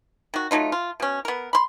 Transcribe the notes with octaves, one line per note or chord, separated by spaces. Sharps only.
D#3 F#4
F#3 A3 D#4 F4
F4
B2 C#4
B3 A#4
B5 C6